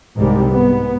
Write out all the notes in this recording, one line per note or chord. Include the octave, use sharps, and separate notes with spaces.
C2 G#2 C3 D#3 G3 G#3
G#2 B3